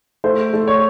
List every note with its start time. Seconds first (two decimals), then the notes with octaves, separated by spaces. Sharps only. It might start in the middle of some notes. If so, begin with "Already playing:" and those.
0.24 A3 C5
0.54 A3
0.68 C#5